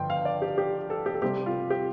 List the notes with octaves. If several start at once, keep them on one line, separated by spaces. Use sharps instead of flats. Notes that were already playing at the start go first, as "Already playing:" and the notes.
Already playing: G2 D3 F3 G5 C6
F5
D5
G4
G4
A4
G4
A4
C3 G3 C4 G4
F4
G4